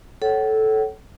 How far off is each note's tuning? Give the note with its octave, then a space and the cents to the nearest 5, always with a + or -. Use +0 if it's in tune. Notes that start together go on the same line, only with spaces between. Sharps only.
A4 -10 C#5 +0 F#5 +40